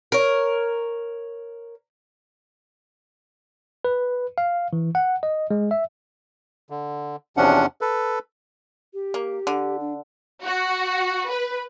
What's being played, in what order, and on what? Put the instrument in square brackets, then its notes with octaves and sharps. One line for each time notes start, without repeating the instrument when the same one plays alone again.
[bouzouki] A#4 C#5
[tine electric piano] B4
F5
E3
F#5
D#5
G#3
E5
[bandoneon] D3
E2 C3 F3 C#4 D4 F#5
A4 B4
[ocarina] G4
[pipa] A#3
D3
[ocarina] D4
[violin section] F#4
B4